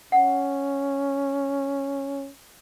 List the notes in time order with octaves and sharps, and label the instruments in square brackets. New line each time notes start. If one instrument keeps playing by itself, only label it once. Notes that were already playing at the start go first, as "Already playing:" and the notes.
[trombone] C#4 [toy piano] F#5